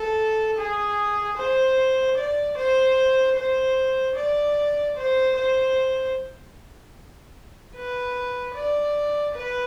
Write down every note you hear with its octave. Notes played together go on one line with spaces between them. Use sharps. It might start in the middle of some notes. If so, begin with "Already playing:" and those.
Already playing: A4
G#4
C5
D5
C5
C5
D5
C5
C5
B4
D5
B4